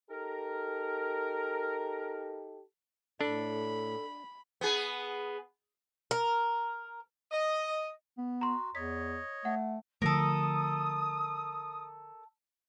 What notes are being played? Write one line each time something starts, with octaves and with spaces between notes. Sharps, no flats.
D#4 G4 A4 A#4
A2 D4 A4 B5
B3 G#4
A#4
D#5
B3
F#4 A#5 C6
E2 C#5 D#5 B6
A3 F#5
D3 F3 A3 A4 A#4 D#6